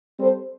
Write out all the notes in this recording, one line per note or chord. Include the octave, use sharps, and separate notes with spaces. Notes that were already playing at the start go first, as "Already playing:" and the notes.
G3 C4 A4 C5